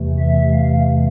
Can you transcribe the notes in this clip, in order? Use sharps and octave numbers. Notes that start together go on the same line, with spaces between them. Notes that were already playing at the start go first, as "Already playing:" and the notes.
Already playing: E2 C3 E3 A3
E5
F5